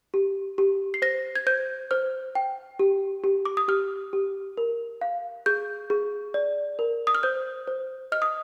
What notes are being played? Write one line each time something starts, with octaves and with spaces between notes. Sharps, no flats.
G4
G4
C7
C5 A#6
G#6
C5 G6
C5 F6
G5
G4
G4
D6
D#6
G4 F6
G4
A#4
F5
G#4 G6
G#4
D5
A#4
D#6
F6
C5 G6
C5
D#5 F6
D#6